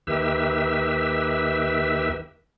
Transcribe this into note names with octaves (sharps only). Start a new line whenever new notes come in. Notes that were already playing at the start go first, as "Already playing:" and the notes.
D#2 D#3 G4 B4 E5 E6